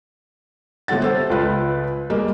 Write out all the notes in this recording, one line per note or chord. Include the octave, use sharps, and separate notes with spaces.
G1 G3 A3 F#5 A6
A4 C5
C#2 F4 B4
G3 G#3 A#3